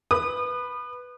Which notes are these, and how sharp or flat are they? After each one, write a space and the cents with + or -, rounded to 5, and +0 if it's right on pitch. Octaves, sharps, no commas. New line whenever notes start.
B4 +0 D#6 -35